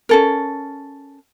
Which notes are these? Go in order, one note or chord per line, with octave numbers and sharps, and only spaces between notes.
C#4 A4 A#4